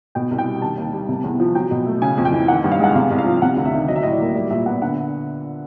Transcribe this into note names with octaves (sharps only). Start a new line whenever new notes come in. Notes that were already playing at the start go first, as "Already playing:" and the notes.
B2 G5
C2
G5
G3
D#3 A5
D#2
G3
C3
E2
F3
F#3 G5
B2
A3
C#3 G#5
F2
G5
E3
D#3 F#5
G2
F5
G#3 F#5
C3 F5
C2
F5
F3
C3 F#5
D2
E5
D#3
F#3 D#5
E5
A2 D#5
D5
A#3
G3 D5
A#2 E5
B3 F#5
D3 F#5